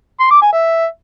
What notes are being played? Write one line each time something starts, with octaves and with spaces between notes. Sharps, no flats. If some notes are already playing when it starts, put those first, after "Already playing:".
C6
D6
G#5
E5